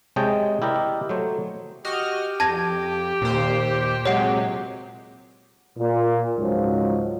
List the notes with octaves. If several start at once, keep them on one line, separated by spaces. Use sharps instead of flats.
C3 G#3 C#5 D#5 G5 A5
E4 G4 A#4 D5 D#5
F#3 A3 C5 C#5
F#4 G4 D#5 F6
F2 A5 G#6 A#6
D#2 A#2 C5
C3 F#3 G#3 C#5 F#5
A#2
C#2 G#2 F3 F#3